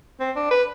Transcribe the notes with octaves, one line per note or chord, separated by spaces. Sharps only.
C4
D4
B4